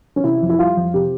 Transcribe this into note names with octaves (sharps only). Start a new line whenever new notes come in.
C#4
C3 E4
F2
E4
G3 F4
F2
C3 G4